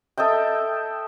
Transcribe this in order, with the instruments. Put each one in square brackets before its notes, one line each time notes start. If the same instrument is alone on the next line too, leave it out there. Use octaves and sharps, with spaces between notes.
[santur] A4 D#5 E5 G5